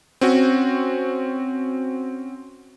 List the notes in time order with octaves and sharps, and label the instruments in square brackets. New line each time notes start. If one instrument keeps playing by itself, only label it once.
[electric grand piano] C4 C#4 F#4